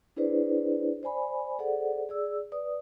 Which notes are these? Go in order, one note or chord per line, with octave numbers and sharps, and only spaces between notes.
D4 E4 G#4 B4 C5 D5
C5 D5 G#5 B5
G#4 A4 C5 D5 F#5
G#4 D5 E6
B4 D5 D#6